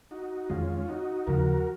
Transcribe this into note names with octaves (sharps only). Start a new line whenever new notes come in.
D#4 F#4
F2 D#3 G#3 C#4 F4
D#4 F#4
D#2 C#3 F3 F#4 A#4